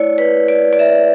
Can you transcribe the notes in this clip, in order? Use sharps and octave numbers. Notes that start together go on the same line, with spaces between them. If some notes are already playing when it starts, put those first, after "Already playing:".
Already playing: A3 E4 C#5 D5
B4
D5
D5
E5